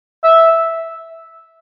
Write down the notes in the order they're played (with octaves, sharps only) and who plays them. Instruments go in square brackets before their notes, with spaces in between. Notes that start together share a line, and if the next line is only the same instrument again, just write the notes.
[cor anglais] E5